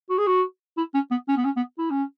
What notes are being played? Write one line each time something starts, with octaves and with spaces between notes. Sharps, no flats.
F#4
G#4
F#4
E4
C#4
B3
C#4
B3
C#4
B3
E4
C#4